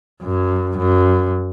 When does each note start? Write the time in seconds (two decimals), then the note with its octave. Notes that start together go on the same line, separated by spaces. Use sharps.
0.22 F#2
0.78 F#2